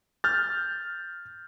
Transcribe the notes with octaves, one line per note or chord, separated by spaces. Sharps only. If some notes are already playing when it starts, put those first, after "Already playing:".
F6 G6 A6